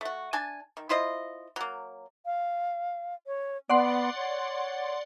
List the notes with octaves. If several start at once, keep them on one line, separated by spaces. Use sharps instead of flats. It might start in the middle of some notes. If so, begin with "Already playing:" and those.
A3 F#4
D4 G#5 A5
D#3
E4 F4 C5 D#5
F#3 A#3
F5
C#5
B3 D5 F#5 C6
C#5